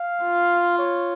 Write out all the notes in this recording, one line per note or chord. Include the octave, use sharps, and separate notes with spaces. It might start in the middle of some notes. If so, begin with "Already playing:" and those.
Already playing: F5
F4
C#5